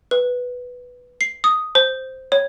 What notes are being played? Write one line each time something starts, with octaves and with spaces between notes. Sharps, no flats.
B4
C7
D#6
C5
C#5